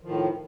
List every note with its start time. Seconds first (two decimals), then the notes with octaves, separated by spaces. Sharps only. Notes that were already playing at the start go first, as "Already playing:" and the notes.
0.01 F3
0.03 D#3
0.06 A2